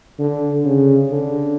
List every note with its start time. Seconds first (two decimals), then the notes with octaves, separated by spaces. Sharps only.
0.19 D3
0.65 C#3
1.10 D3